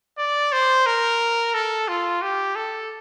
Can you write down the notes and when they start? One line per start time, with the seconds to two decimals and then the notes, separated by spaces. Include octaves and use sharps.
0.18 D5
0.53 C5
0.86 A#4
1.54 A4
1.88 F4
2.22 G4
2.56 A4